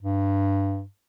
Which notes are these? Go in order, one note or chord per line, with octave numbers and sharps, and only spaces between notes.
G2